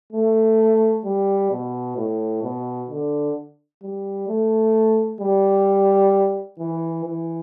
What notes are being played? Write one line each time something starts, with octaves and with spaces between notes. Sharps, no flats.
A3
G3
B2
A2
B2
D3
G3
A3
G3
E3
E3